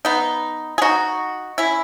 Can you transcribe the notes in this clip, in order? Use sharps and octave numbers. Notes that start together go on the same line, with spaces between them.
B3 D#4
G#4
D#4 F#4
C#4 E4